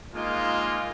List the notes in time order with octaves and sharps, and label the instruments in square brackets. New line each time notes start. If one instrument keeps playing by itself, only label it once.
[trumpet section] G#3 A#3 D#4 F4